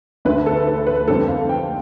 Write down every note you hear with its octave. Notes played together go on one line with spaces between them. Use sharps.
D2 D3 A3 B4
A4
B4
B4
F2 D3 G3 C4 A4
F5
G5